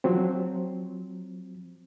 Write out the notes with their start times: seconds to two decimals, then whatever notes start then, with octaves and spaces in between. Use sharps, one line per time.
0.04 F3 F#3 C4